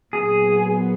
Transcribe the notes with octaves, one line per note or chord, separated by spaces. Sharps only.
A#2 F#3 B3 G#4